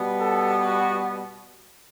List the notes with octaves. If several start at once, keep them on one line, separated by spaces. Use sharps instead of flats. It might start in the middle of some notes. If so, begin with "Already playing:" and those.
Already playing: B2 G3 B3
A4
F#4